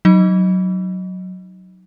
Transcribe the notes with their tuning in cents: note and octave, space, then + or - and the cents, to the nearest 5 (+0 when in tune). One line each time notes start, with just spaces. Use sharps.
F#3 +0 D#4 +0 D#5 +0